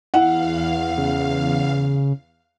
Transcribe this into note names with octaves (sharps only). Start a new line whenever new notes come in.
E2 E4 F5 F#5
C#3